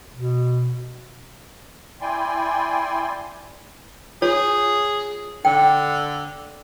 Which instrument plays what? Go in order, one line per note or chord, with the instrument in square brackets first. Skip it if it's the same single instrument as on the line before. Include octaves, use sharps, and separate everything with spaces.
[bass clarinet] B2
[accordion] E4 D5 G5 G#5 C6
[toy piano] F4 C#5 [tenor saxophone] G#4
[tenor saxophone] D3 [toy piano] G5